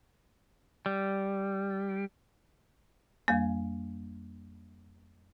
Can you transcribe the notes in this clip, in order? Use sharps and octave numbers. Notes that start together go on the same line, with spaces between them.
G3
F2 G3 A#3